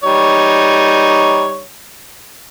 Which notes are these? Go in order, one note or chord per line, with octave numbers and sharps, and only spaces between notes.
G3 D#4 C#5